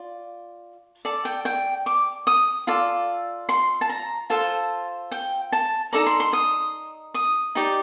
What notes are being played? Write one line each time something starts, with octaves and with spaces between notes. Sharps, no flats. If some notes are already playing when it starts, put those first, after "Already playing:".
Already playing: F4 D5
A4 D5
G5
G5
D6
D#6
F4 A4 D5
C6
A5
A#5
F4 A4 C5 A5
G5
A5
D#4 A4 D5 A#5
C6
C6
D#6
D#6
D#4 G4 D5